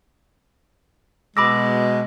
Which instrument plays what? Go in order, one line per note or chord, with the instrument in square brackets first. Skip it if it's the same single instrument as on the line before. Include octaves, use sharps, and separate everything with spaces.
[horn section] B2 G#3 [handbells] B5 D6 E6 [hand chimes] A#6